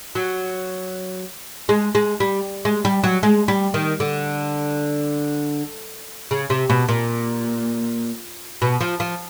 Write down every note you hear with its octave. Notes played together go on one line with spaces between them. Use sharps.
F#3
G#3
G#3
G3
G#3
G3
F#3
G#3
G3
D#3
D3
C#3
C3
B2
A#2
B2
F3
F3